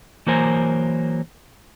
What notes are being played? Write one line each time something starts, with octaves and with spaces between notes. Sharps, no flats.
E3 F#3 A#3 A#4 C5 G#5